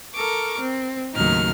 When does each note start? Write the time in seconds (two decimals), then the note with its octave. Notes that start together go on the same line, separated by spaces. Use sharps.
0.14 A4 A#4 C#6 D6
0.59 C4
1.15 D#2 A2 C#3 F#3 D#4 F6